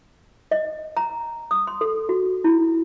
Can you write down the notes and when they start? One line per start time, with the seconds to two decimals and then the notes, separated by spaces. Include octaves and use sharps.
0.51 D#5
0.97 A#5
1.51 D#6
1.67 C6
1.81 A4
2.09 F#4
2.44 E4